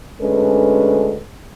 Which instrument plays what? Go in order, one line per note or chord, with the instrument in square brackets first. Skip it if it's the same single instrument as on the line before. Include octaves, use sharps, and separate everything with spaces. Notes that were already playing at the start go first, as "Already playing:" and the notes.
[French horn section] D2 G#3 C#4 D4 A4 B4